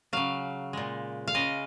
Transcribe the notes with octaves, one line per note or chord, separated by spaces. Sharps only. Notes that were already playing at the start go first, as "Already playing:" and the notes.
C#3 F#3 F5
A#2 G#3
F5
C#3 G#3 D#5